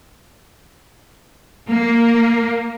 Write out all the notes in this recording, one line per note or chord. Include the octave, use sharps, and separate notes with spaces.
A#3